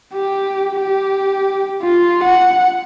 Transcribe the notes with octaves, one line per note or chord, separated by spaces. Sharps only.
G4
G4
F4
F#5